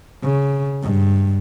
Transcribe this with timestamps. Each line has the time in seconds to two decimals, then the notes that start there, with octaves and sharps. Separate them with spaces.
0.22 C#3
0.82 G2